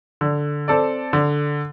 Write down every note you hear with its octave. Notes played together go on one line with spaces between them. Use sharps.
D3
C4 A4 D5
D3